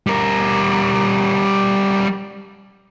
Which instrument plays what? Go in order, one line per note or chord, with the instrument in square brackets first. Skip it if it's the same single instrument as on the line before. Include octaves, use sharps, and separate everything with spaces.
[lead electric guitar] G3 A#4